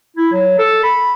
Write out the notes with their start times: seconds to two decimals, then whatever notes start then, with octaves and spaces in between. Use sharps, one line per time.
0.17 E4
0.32 F#3
0.59 A4
0.84 B5